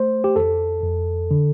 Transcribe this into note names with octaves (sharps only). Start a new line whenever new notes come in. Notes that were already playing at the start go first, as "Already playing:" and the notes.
Already playing: A3 C5
G4
F2 A4
F2
D3